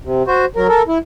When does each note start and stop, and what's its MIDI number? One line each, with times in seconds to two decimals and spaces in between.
0.05 0.23 48
0.27 0.45 66
0.27 0.45 72
0.56 0.67 54
0.56 0.67 70
0.69 0.82 69
0.69 0.82 70
0.88 0.98 64